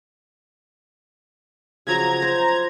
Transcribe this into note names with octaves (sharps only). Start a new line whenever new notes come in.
C#3 F3 F#3 A#5 G#6
C5